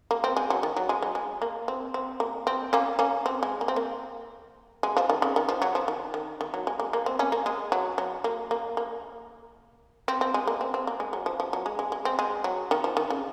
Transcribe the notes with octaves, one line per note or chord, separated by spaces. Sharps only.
A#3
C4
G#3
F#3
D#3
F#3
G#3
F#3
G#3
A#3
C4
C4
A#3
C4
A#3 C#4
A#3 C#4
C4
G#3
A#3
C4
A#3
G#3
F3
D#3
C#3
D#3
F3
F#3
F3
D#3
D#3
D#3
F#3
G#3
A#3
A#3
C4
A#3 C#4
A#3
G#3
F#3
F#3
A#3
A#3
A#3
C4
C4
G#3
A#3
C4
C4
A#3
G#3
F#3
F3
F3
F#3
G#3
G#3
G#3
C4
G#3
F#3
D#3
F3
D#3
C#3